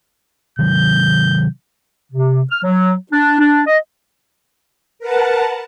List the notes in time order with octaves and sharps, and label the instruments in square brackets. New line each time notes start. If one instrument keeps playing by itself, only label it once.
[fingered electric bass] C3 D#3 F#3 [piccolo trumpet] G6
[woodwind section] C3
F6
F#3
D4
D4
D#5
[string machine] A#4 B4 F#5 A5